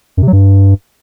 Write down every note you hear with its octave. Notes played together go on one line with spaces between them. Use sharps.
F#2
C3
F#3
G2